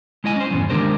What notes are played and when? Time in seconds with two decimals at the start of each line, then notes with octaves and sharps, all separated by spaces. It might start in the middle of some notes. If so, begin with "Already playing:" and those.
0.24 G#3 E4 D#5 G#5
0.36 C#4 C5
0.51 E2 G2 B2 E3
0.70 D#3 G#3 D4 G4 A#4 C5